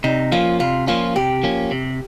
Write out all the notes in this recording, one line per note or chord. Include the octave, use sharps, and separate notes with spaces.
C3 D#4
F3 A#3 C#4 F4
C3 F4
F3 A#3 C#4 F4
C3 G4
F3 A#3 C#4
C3